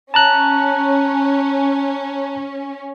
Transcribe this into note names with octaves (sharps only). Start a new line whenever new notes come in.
C#4 A5 A#5 F#6